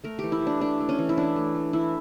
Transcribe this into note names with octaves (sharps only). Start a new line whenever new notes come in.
A3 A#4
E3 G4
E4
E3
D4
A3 D4
A3
C#4
E3
E4
E3 D4
A3
A3
E3 E4